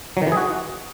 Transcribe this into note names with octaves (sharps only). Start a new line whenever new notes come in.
F#3
D#3
E3
G#4
F#4